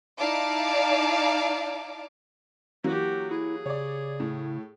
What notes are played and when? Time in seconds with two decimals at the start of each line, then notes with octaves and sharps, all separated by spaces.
0.18 D#4 E4 D5 F5 A5 D6
2.84 E3 F#3 A#3 F#4 G4
3.31 E4 G#4
3.66 C#3 C#5 D5
4.20 A2